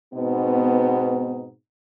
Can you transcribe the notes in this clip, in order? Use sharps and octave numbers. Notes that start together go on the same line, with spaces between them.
G#2 B2 B3 C4 D#4